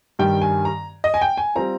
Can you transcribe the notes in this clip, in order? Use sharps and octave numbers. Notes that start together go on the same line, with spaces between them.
G2 D#3 G3 G5
G#5
A#5
D#5
G#5
G5
G#5
G3 C4 F4 A#5